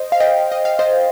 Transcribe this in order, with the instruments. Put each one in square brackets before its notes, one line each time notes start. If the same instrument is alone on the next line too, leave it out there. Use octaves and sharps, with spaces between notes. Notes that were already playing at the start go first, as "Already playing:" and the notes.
Already playing: [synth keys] C5 D#5
F5
D#5 G5
D#5
F5
C5 D#5